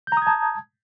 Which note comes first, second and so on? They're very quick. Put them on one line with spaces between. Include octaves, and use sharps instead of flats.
G6 A#5 D#6 G#6 A5